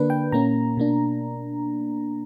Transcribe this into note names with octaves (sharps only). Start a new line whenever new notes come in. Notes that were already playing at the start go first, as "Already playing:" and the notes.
Already playing: D3 A#3 D4 B4
G5
A#2 A#3 C#4 A#5
B2 A#3 D4